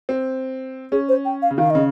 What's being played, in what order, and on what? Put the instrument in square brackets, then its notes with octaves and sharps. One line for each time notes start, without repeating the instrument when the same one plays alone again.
[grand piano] C4
[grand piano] C#4 [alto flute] G#4
[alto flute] C5
G5
F5
[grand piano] C#3
[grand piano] D#3 [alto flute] F5
[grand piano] C#3 [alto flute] D#5